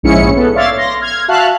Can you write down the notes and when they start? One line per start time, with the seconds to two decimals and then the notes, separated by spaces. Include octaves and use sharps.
0.03 A#1 G#2 C#4 E4 G#4 C#7
0.36 B3 A4
0.54 C#5 D5 E5 F5 C6 A6
0.77 C6 A#6
1.01 F6 G#6
1.28 F#4 E5 F5 A5 F6 F#6